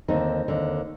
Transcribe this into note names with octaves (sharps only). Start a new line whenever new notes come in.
D#2 D3 C4 D#4
D#2 D3